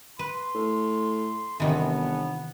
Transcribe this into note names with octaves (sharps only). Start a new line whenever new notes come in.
B4 C6
A2
G1 C3 D#3 E3 B3